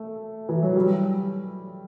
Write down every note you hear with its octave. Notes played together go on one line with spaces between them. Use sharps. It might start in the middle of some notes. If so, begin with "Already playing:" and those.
Already playing: A3
E3
F#3
G3